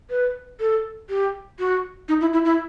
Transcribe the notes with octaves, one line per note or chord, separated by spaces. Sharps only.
B4
A4
G4
F#4
D#4
E4
E4
E4